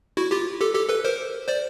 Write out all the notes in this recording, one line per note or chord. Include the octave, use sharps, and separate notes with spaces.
E4 F#4
F4 G4
G4 A4
G4 A4
A4 B4
A#4 C5
C5 D5